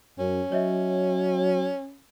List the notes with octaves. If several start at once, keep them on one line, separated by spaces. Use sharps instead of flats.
F#2 C#4
F#3 C#5 D#5 E5